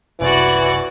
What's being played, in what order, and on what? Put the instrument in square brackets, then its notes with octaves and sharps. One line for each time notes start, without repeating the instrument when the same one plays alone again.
[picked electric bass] F#1 C2 [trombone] E3 [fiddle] F#4 D5